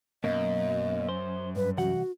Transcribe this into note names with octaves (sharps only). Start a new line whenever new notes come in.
B1 F#2 B2 A#3 D#5
C5
G2 B4
C2 E3 F#4 F#5